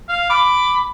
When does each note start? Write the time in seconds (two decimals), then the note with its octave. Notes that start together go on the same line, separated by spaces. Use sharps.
0.09 F5
0.29 B5 D6